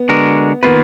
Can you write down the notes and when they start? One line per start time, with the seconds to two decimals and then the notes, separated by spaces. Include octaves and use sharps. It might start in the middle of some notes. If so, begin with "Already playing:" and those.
Already playing: B3
0.09 D3 G#3 D4 F#4 A#4
0.63 D#3 A#3 B3 F4 B4